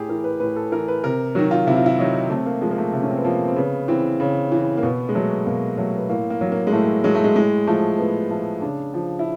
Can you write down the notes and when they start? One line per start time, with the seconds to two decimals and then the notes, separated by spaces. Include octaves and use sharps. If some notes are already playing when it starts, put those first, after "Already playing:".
Already playing: A2 G4 G#4
0.09 E3 A#4
0.24 B4
0.40 A2 B4
0.56 A4
0.72 E3 A#4
0.88 B4
1.04 C3 A#4
1.35 D#3 F#3 F#4
1.51 F4
1.67 C3 E4
1.76 F4
1.86 E4
1.98 D#3 F#3 D#4
2.30 C3 A3
2.46 A#3
2.61 F3 G#3
2.71 A#3
2.78 A3
2.93 C3 A3
3.03 C#4
3.10 C4
3.17 B3
3.25 F3 A#3
3.48 C4
3.56 C#3 B3
3.88 E3 C4
4.20 C#3
4.52 E3
4.77 A#3
4.83 B2 B3
5.09 G#3
5.15 F#3 A3
5.46 B2 A#3
5.77 F#3 A3
5.97 B3
6.09 A2 A#3
6.30 A#3
6.41 F#3
6.52 A#3
6.67 G#3
6.72 A2 A3
7.04 F#3 G#3
7.15 A3
7.24 G#3
7.35 A2 G#3
7.67 F3 A3
7.98 A2 B3
8.30 F3 A3
8.62 C#3 D4
8.94 F3
9.19 E4